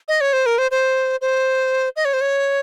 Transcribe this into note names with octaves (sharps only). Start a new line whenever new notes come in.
D#5
C#5
C5
A#4
C5
C5
C5
D#5
C#5
C5
C#5